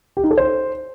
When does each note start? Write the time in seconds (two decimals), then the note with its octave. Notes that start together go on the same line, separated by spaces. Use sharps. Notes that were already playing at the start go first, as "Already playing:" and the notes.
0.17 G4
0.24 D#4
0.31 A4
0.37 C5